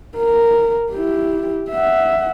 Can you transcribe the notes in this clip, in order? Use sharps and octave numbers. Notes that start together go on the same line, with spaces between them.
A#4
E4 G4
E5 F#5